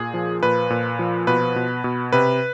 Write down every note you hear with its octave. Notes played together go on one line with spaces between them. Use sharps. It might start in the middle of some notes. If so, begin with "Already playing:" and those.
Already playing: A#2 G#4
F3
A#2 B4
A#2
F3
B2 B4
B2
B2
C3 B4